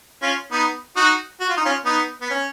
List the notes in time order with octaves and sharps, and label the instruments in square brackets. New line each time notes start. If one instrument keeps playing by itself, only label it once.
[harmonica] C#4 F4
B3 D#4
D#4 F#4
F#4
F4
D#4
C#4 F4
B3 D#4
B3
C#4